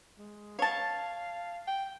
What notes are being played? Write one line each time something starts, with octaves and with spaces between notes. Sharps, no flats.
G#3
C#5 F5 A5
G5